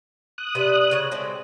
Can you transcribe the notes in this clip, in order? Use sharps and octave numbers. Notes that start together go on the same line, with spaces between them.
D#6 F#6
C3 B4 D5
C#3 C#5
G#3 A3 C4